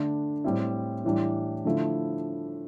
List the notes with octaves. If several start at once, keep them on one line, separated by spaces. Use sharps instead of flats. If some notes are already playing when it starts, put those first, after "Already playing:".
Already playing: D3 A3 D4
A2 G3 C4 E4
A2 E3 G3 D4
D3 F3 A3 E4